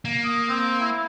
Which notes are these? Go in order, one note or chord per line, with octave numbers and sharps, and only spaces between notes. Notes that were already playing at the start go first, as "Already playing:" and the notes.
A#3
D#6
C4
E4